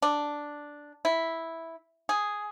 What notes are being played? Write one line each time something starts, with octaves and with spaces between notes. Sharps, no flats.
D4
E4
G#4